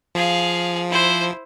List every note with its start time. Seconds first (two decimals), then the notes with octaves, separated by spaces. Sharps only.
0.15 F3 G#4 F5
0.89 E4 C5